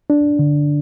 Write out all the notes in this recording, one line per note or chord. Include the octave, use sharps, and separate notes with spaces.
D4
D3